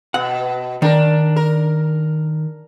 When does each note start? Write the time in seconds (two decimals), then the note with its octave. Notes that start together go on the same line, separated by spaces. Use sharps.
0.14 B2 F#5
0.82 D#3 D4 A#4
1.36 A#4